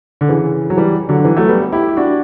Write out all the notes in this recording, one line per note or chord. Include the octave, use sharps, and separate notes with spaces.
D3
C#3 E3
F#3
E3 G3
D3 F#3
F#3
E3 G3
F#3 A3
G3 B3
E4 G4
D4 F#4